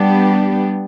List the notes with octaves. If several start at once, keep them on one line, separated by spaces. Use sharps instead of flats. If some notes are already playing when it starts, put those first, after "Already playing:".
Already playing: G3 B3 D4 G4